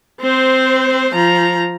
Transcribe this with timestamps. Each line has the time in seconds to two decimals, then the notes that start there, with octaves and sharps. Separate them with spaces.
0.21 C4 C5
1.15 F3 A#5